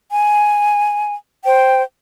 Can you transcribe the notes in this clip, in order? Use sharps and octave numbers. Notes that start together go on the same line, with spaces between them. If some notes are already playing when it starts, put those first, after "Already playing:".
G#5
C5 G5